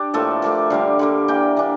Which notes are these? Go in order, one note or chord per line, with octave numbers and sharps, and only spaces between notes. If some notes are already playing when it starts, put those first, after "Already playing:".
Already playing: D4 G4
A2 F3 A#3 A4
A2 F3 A#3
D3 G3 A#3 F5
D3 G3 A#3
E3 A#3 D4 G5
E3 A#3 D4